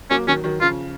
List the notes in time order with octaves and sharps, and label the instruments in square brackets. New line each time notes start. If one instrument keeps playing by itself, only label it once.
[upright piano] F#3 A#3 [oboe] C#4
[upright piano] D#3 F#3 [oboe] C#4
[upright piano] D#3 F#3
[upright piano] C#3 F3 [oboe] F4